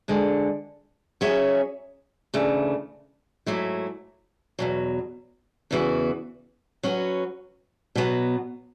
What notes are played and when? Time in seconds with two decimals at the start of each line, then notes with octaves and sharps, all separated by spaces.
0.08 D2 D3 G#3
1.21 F#3 C#4 G#4 C#5 E5
2.34 D2 C#3 E3 A3
3.46 G#2 F#3 A3 E4
4.59 E2 B2 F#3
5.71 E2 C#3 E3 B3 F#4
6.83 F#3 C#4 F#4 B4
7.95 B2 F#3 B3